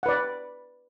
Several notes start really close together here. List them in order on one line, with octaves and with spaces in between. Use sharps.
F#5 B4 D5